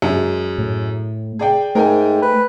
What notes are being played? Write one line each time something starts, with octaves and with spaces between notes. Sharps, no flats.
F#2 G#3
A2
G#4 D5 G5
G#2 A3 A#4 G5 G#5
B4